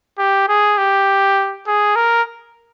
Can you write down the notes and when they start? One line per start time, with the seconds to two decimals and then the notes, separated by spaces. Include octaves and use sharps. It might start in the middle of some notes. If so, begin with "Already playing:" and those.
0.18 G4
0.48 G#4
0.77 G4
1.67 G#4
1.96 A#4